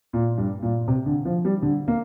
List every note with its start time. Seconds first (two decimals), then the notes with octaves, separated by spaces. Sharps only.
0.13 A#2
0.38 G2
0.62 A#2
0.88 C3
1.06 D3
1.25 F3
1.45 G3
1.62 D3
1.88 A#3